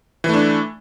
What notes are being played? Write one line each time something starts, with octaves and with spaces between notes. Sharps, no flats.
E3 A3 D4